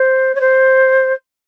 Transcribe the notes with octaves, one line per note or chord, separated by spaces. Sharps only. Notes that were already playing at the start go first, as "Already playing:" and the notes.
Already playing: C5
C#5
C5